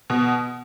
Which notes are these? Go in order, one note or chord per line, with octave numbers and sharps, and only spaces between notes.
B2